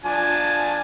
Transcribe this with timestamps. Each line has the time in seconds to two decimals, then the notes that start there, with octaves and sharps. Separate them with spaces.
0.04 F3 D4 G#5